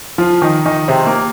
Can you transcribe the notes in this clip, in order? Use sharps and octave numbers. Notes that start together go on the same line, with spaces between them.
F3 F4
D#3 D#4
D#3 D#4
C3 C4
A#3